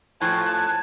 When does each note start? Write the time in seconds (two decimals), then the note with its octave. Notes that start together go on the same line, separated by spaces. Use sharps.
0.21 A2 F3 G#5 A5 F#6